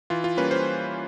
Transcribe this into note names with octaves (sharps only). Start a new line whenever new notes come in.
E3 F4
F4
G3 A#3 C#4 B4
C5